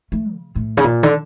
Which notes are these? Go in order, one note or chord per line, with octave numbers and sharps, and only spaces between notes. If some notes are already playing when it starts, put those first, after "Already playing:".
A3
C#3
A2
C#3
A#2
D3